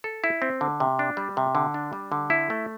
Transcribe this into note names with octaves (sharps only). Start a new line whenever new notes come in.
A4
E4
C4
D3
C3
D4
G3
C3
D3
D4
G3
D3
E4
A3